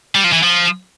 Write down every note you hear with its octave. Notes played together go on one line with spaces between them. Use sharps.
G3
F3
E3
F3